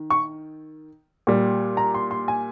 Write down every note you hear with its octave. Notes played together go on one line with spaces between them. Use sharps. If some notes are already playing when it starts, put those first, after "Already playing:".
Already playing: D#3
C#6
A#2 G3
A#5
C6
C6
G#5